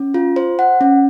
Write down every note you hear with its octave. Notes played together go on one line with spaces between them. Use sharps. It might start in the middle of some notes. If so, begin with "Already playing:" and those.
Already playing: C#4
F4
C5
F#5
C#4